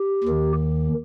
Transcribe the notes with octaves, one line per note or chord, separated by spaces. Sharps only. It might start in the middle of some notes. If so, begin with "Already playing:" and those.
Already playing: G4
D#2 D#3